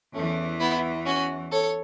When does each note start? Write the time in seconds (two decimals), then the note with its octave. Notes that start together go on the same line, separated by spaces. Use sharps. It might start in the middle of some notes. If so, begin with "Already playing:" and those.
0.14 E2 E3 A3 C#4
0.59 B3 E4
1.05 C#4 F#4
1.51 A4 C#5